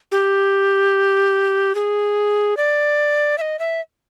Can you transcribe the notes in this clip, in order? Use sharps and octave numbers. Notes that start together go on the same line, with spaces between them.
G4
G#4
D5
E5
D#5
E5